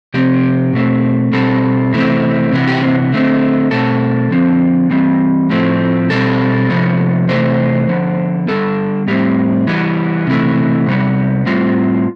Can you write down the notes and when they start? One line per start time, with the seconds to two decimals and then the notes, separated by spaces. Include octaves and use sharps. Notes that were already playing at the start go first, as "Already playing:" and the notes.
0.14 C3 F3 C4 G4
0.73 B2 A3 C4
1.33 B2 G3 C4 A4
1.93 C3 E3 A3 C4
2.52 C3 E3 B3
2.68 G4
2.82 C4
3.12 D3 A3 C4
3.71 B2 A3 C4 A4
4.31 D3 F3 C4
4.90 E3 G3 C4
5.50 A2 F3 A3 C4
6.10 B2 G3 C4 A4
6.70 C3 F3 B3
7.29 C3 E3 A3 C5
7.89 D3 F3 B3
8.48 D3 G3 B3 A4
9.08 A2 G3 C4 G4
9.67 E3 G3 B3
10.27 C3 E3 A3
10.86 C3 G3 B3
11.46 A2 G3 C4 F4